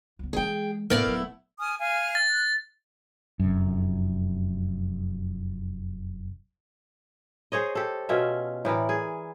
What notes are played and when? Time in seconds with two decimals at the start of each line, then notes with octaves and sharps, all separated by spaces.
0.19 C#2 B3
0.33 E3 G#3 G#4 G5
0.90 A2 A3 B3 C#4 E4 A#4 D5 F5
1.06 D#1 F#3
1.59 G#5 D#6 F6
1.79 F5 G#5 F6
2.15 A6
2.29 F#6
3.40 F1 F#2
7.52 G#4 C5 C#5 D#5
7.75 G4 A4
8.09 B2 C#4 F4 E5
8.65 A2 E3 A#4 D5
8.89 G#4